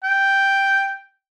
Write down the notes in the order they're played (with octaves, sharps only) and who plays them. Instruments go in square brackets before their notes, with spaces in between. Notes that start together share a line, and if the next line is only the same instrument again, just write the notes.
[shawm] G5